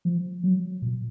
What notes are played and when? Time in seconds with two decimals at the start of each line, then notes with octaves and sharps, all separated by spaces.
0.05 F3
0.44 F#3
0.82 A#2